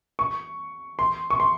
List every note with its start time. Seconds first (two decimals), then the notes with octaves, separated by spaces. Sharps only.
0.19 C#6
0.99 C6
1.30 C#6
1.40 C6